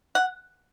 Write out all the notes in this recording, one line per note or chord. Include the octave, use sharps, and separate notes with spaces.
F#5